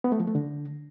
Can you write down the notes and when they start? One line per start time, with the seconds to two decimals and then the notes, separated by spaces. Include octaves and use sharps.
0.04 B3
0.12 A3
0.20 F3
0.27 A3
0.35 D3